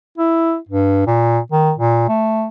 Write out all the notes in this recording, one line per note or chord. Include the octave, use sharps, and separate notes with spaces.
E4
G2
A#2
D#3
A#2
A3